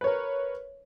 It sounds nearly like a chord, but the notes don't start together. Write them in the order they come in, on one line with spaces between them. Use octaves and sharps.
B4 C#5 A#4